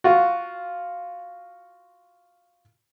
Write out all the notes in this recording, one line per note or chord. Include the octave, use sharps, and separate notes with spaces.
F4 F#4